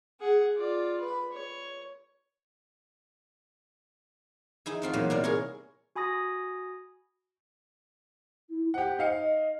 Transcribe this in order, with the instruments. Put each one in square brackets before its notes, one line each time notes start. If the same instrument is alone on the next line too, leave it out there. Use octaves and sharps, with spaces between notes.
[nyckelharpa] G#4 F#5
F4 D5
B4 B5
C#5
[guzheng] D#4 E4 G#4
A3 C4 F4
A#2 E3 F#3 A#3 B3
C3 G3 E4 A#4 D5
G#4 A#4 C#5
[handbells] F#4 G#5 B5 D#6 A#6
[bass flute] E4
[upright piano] G4 F#5 [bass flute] C5
[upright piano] D#4 F5 C#7
[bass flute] D#5